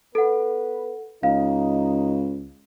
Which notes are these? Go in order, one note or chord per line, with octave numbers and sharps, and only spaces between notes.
B3 A4 B4 F#5
C#2 D#4 F5